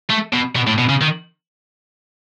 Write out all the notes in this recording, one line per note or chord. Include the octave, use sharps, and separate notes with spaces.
A3
B2
B2
A2
B2
C#3
D#3